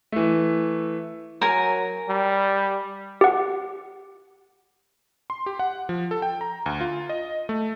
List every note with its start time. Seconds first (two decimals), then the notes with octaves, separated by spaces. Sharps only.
0.12 E3 A3
1.41 F#3 A#4 G#5
2.09 G3
3.21 G4 F#5
5.30 C6
5.46 G4
5.59 F#5
5.89 F3
6.11 A4
6.22 G5
6.41 A#5
6.66 D2
6.81 F4
7.09 D#5
7.49 A3